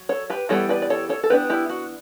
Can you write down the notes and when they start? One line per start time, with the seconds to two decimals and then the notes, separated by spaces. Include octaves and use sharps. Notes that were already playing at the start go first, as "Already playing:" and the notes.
Already playing: F#3
0.09 A4 C#5
0.30 G4 B4
0.49 E3 G3 B3 A4 C#5
0.69 B4 D5
0.82 D5
0.90 A4 C#5
1.09 A4 C#5
1.23 A4
1.30 E3 B3 D4 G4 B4
1.50 E4 G4
1.69 F#4